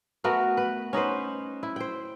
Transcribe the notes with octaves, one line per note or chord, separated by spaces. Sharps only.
A3 B3 F#4 A#4
B4
C#4 D#4 B4 C5
E4
C5 G5